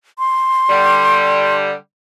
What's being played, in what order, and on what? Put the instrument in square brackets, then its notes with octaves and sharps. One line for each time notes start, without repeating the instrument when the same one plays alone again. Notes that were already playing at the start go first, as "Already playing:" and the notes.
[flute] C6
[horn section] D3 G3